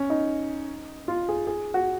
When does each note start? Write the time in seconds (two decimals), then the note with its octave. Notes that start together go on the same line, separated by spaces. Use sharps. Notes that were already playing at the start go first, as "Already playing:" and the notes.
Already playing: C#4
0.10 D#4
1.08 F4
1.29 G#4
1.47 G#4
1.74 F#4